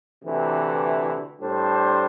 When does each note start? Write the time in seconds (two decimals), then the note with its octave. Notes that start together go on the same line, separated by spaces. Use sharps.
0.24 D2 C3 E3
1.40 A2 G3 D4 C5